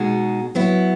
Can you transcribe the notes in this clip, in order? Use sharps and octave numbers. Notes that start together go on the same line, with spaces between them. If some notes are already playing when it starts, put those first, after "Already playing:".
Already playing: B2 G#3 D#4 F#4
F#3 B3 E4